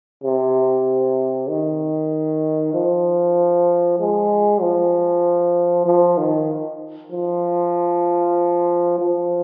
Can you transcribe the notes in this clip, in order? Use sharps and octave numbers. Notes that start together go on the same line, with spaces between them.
C3
D#3
F3
G#3
F3
F3
D#3
F3
F3